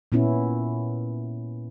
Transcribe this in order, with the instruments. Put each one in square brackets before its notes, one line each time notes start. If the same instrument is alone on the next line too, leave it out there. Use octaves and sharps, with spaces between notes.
[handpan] A#2 B3 C#4 E4